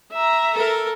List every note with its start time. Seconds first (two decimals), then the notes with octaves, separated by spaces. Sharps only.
0.13 E5 A#5
0.53 A4 A#4